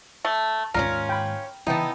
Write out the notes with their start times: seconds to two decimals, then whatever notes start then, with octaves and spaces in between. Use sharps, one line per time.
0.25 A3
0.74 D#2 G#2 C#4 D#4 F4 A#4
1.09 G5 B5
1.67 C#3 E3 B3 D#4 E4 G5 A5